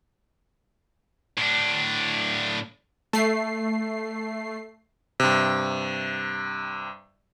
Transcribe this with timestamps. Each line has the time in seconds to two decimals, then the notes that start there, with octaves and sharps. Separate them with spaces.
1.38 A2 D4
3.13 A3 C7
5.20 G2 C3